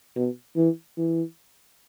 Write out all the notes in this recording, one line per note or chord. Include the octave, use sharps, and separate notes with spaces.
B2
E3
E3